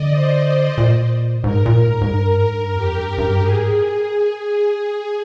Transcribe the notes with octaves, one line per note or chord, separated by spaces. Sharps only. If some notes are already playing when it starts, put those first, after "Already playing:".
Already playing: D3 D5 D#5
C5
A#2
G#2 A#4
A#2
G#2
G#2
G2 A#4
G#2
G2
F2 G4
G2
G2
G#2 G#4